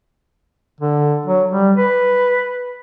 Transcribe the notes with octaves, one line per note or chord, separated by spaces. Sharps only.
D3
F#3
G3
B4